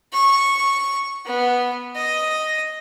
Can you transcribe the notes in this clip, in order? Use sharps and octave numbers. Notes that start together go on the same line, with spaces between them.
C#6
B3
D#5